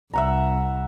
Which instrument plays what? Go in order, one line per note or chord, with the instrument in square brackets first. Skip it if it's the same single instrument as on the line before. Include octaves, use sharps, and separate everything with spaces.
[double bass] C2 [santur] E5 F#5 A#5